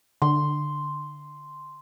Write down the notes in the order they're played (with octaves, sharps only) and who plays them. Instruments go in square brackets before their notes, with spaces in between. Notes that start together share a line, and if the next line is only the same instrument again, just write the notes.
[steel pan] D3 [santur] C6